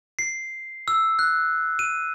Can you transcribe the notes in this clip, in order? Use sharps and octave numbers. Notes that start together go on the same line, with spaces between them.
C7
E6
F#6
D#7